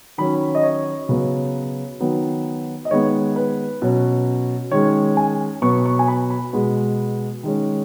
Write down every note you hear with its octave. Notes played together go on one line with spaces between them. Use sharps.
D#3 F#3 C#4 B5
D#5
C#5
C#3 F#3 B3
D#3 F#3 B3
D#5
D#3 G#3 B3 C#5
B4
B2 F#3 C#4
D#3 G#3 C#4 C#5
G#5
B2 F#3 B3 C#6
C#6
G#5
B5
B5
B2 G#3 B3
D#3 G#3 C#4